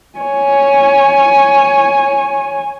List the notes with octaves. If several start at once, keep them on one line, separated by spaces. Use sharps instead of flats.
C#5 G#5